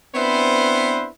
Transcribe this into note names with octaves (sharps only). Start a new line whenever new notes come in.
B3 C4 D4 E4 B4 C5